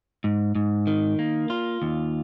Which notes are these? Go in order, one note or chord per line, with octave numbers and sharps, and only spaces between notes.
G#2
G#2
D#3
A#3
F4
D#2